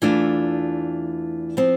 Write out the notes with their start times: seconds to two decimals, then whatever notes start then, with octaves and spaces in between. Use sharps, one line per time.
0.02 E2 E3 A3 D4 F4
1.57 F3 C4